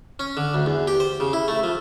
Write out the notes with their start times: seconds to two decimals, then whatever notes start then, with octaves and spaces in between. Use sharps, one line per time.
0.19 C#4
0.37 D3
0.54 D2
0.66 E2
0.88 G4
1.00 C5
1.20 C#3
1.33 E4
1.48 A3
1.63 F3